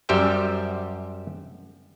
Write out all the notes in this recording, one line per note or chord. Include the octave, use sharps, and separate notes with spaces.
F#2 G3 G4 C5 E5 G5